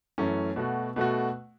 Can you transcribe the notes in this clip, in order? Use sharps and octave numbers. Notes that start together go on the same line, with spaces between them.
F#2 E3 A3 C#4
B2 A3 F#4
B2 A3 F#4